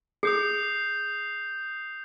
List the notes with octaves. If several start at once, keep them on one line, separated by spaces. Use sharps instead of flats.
G#4 D#6 G6 C7